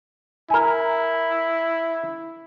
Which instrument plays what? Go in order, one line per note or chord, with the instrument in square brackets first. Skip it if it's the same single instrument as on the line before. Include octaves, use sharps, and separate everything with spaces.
[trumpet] E4 [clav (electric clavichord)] A#4 G#5